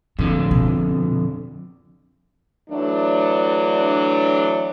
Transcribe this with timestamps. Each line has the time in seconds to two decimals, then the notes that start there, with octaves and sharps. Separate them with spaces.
0.19 F2 A2 D3
0.51 B2
2.69 E3 F#3 A3 D4